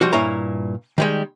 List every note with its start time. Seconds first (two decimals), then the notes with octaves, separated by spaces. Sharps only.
0.01 F3 G3 F#4
0.13 G2 A#2 E4 C#5 A#5
0.98 D#3 G3 G#3